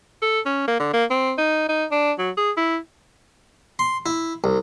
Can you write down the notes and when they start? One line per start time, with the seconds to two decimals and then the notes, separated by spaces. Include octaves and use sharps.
0.22 A4
0.46 C#4
0.68 A#3
0.80 D3
0.94 A#3
1.10 C4
1.38 D#4
1.69 D#4
1.91 D4
2.19 F#3
2.37 G#4
2.57 E4
3.79 C6
4.06 E4
4.44 C2